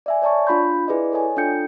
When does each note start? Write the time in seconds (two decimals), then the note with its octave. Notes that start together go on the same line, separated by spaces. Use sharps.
0.06 D5 E5 G#5
0.22 C#5 D5 A5 C#6
0.47 D4 F4 B5 C6 G6
0.88 E4 G#4 B4 D5 D#5
1.12 A4 C#5 D#5 G#5
1.37 D4 F4 A4 G5 G6 C#7